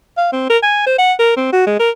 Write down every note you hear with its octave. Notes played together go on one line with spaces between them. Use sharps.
F5
C4
A#4
G#5
C5
F#5
A#4
C4
F#4
G#3
A#4